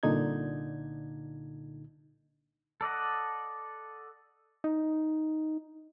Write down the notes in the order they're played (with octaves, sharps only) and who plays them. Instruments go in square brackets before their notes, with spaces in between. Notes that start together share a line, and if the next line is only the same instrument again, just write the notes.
[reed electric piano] C2 A#2 D3 D#4 G#6
[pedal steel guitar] A4 D5 D#5 F#5
[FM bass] D#4